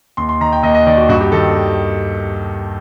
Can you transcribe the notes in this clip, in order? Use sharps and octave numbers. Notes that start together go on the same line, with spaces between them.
D#2 C6
C6
D#3 A#5
G5
D#2 D#5
D#5
D#3 D5
F#4
G2 F#4
G4
D#3 A4